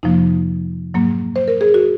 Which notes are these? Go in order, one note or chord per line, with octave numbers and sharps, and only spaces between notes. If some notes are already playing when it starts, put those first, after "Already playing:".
F2 C3 F3 A#3 D#4
G#2 F#3 A#3
C5
A#4
G#4
F#4